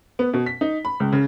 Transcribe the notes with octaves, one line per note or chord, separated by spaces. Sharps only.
B3
B2
B6
D#4
B5
C#2
C#3